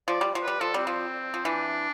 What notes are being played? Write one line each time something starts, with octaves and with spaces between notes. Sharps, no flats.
F3 D5
G3
F3
G3 B4
F3 A4
G3 C4
F3
F3
E3 D4